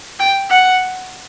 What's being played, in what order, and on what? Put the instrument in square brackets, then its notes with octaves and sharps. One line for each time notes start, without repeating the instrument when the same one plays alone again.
[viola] G5
F#5